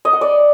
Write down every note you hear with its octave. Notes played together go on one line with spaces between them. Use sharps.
D#5
F#5
D5